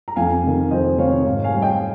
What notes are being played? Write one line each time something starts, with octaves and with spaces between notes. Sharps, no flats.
A#5
F2 F5 G#5
C3 D#3
F2 C5 D#5
C3 D#3 C#5 F5
G#2 C#5 F5
F5 G#5
G3
D#5 G5